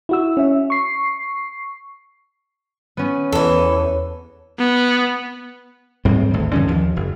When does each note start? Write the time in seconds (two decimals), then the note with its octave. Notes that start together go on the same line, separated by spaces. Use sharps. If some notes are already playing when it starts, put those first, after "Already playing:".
0.09 E4 F#4 E6
0.37 C#4 E5
0.70 C#6 C7
2.97 B3 C#4
3.32 E2 E3 A4
4.59 B3
6.05 A1 G#2 G3 C4
6.34 G#1 D2
6.53 G2 D3 F3 C#4
6.67 D#2 F3
6.96 F#1